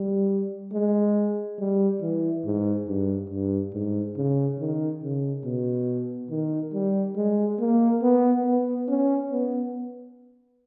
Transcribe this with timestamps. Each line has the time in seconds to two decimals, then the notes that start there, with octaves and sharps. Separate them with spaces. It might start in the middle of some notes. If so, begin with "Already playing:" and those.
Already playing: G3
0.72 G#3
1.58 G3
2.01 E3
2.45 G#2
2.88 G2
3.30 G2
3.73 G#2
4.17 C#3
4.59 D#3
5.02 C#3
5.44 B2
6.30 D#3
6.73 G3
7.16 G#3
7.59 A#3
8.02 B3
8.45 B3
8.88 C#4
9.31 B3